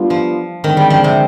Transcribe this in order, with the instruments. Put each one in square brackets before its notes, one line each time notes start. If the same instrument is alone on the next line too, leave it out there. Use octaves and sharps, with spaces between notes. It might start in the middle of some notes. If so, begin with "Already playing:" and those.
Already playing: [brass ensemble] G3 B3 D4 F4
[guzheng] F3
[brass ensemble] D3 G#3 C4 [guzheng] D#3
[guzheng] G3
F3
C3